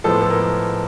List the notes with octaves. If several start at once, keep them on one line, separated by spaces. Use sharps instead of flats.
A2 F3 G#3 B3 A4
A4
A#4